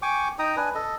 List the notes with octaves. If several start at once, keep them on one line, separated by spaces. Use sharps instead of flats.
G5 G#5 C#6 D6
D#4 G5 A#5 D#6
D4 B4 G#5
A4 D#5